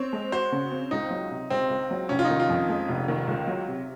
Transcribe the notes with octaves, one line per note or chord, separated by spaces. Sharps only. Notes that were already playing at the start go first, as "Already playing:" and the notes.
Already playing: C4 C#5
G#3
F#4 C5
C#3
C4
C#2 D#4
F#3
C3
C#2 C4
C#2
F#3
F1 C#4
F4
D#4
D#3
F4
F2
G#3
F1
D#3
C#2
F#3
C3